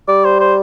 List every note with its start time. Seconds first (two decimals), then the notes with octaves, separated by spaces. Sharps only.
0.08 G3 D5
0.25 C5
0.40 C5